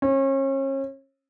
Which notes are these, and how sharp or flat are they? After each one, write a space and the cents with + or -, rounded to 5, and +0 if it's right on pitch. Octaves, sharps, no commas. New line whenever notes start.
C#4 -35